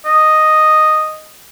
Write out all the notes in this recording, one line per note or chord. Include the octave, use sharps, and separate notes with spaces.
D#5